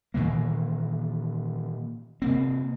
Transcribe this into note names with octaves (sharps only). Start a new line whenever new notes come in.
A#2 D#3 E3 A#3
C3 A#3 C4